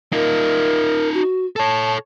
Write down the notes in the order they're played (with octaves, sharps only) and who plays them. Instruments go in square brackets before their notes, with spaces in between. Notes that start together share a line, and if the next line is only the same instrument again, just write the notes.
[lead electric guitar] D#4 F4 [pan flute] A#4
[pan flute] F#4
[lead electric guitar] A4 C#5 [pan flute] A5